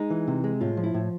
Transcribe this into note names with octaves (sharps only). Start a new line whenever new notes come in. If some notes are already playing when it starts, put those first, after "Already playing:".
Already playing: G#3 D#4
E3
C3
G#3
A2 F4
F3
E4
A2